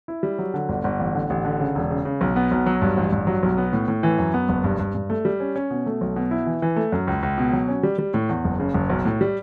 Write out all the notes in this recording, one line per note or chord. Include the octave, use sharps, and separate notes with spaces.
E4
G3
F#3
D3
G1
G1
A1
D3
A1
D3
C#3
E1
C#3
C#3
B1
B3
B1
F#3
G2
A1
G2
F#3
B1
B3
A2
A2
E3
F#2
B3
F#1
G2
G2
G2
A3
G3
C#4
C#4
B2
A3
B1
B2
E4
E3
E3
A3
F#2
C#2
C#2
B2
F#3
C#4
G3
G3
A2
E2
F#1
C#3
F#1
B1
A2
G3